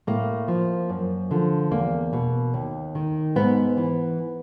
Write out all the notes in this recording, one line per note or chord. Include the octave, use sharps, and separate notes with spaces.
A2 A#3
F3
F#2
D3 F3
E2 A#3
B2
D#2
D#3
G#2 B3
E3